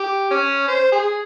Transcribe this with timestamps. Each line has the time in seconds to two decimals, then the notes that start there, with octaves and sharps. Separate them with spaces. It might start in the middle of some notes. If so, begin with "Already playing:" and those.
Already playing: G4
0.31 C#4
0.68 C5
0.92 G#4